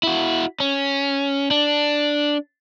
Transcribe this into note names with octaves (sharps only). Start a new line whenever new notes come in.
E4 F#4
C#4
D4